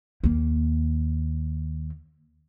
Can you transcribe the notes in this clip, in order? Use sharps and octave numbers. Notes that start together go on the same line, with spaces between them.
D#2 A#3